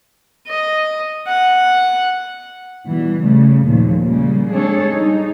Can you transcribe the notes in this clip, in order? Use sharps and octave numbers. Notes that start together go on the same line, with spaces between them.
D#5
F#5
B2 E3 G3
C#3 G3 A3
D#2 A#2 D#3 F3
C#3 G3 G#3 A#3
G#3 C4 D4 G#4 A4 C#5
G3 D#4